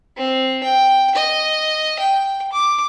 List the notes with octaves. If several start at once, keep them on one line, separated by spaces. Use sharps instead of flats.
C4
G5
D#5
G5
D6